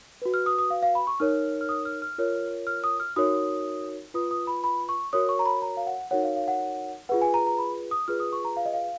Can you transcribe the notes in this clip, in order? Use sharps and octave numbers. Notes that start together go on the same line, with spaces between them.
F#4 B4
F6
D#6
D#6
F5
F5
B5
C#6
D#4 A#4 C#5 F6
F6
D#6
F6
F6
F4 A#4 C#5
F6
D#6
F6
D#4 F#4 A#4 C#5 D#6
F4 B4 D#6
D#6
B5
B5
C#6
F#4 A#4 C#5 D#6
C#6
A#5
B5
A#5
F5
F#5
D#4 F#4 A#4 C#5 F#5
F5
F5
F#5
F4 G#4 B4 F#5
G#5
A#5
A#5
B5
D#6
F4 G#4 B4 F6
D#6
C#6
A#5
F5
D#5
F5